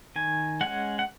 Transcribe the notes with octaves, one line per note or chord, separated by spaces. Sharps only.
D#3 G#5
G#3 C#4 F#5
F#5